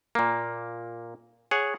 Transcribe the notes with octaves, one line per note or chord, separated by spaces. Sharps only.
A#2 A#3
G#4 C#5 F#5